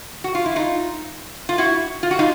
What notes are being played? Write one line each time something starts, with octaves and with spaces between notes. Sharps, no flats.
F#4
F4
E4
D#4 F4
F4
E4 F#4
F4
F#4
D#4 F4